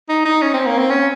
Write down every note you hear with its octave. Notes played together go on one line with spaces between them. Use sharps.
D#4
D#4
C#4
C4
A#3
C4
C#4